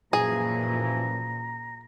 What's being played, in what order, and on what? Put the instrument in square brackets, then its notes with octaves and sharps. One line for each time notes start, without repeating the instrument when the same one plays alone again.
[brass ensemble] F#2 E3 F3 [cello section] A#2 [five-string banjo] G#4 [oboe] A#5